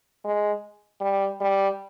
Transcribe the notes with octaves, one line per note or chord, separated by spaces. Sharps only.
G#3
G3
G3